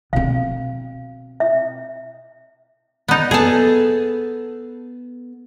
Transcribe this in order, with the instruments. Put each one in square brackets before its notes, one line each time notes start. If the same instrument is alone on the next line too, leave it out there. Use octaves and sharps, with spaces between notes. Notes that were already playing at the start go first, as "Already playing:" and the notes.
[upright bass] B2 C4 [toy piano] F5
[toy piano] E5
[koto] B3 D#4
[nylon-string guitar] B3 A4 [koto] G#4 A5